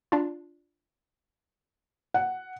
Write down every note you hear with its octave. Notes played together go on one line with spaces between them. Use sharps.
D4 F4
F#5